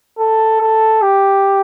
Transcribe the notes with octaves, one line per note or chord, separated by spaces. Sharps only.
A4
A4
G4